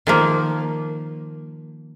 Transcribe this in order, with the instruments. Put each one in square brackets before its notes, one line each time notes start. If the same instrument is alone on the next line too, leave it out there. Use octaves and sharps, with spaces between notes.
[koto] D#3 F3 A#3